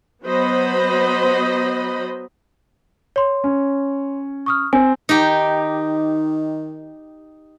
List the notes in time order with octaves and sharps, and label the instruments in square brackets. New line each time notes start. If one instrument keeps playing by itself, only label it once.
[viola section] F#3 B3 C5 D#5 B5
[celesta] C#5 C6
[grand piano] C#4
[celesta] C#6 D#6 F6
[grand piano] C4 [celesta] G#5
[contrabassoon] D#3 [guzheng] D#4 G4